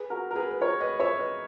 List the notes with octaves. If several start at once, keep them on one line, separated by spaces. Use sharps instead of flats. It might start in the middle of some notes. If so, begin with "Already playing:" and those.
Already playing: G#4 B4
F#4 A#4
A#4
G#4 B4
B4
A#4 C#5
B4 D#5
C#5 E5
B4 D#5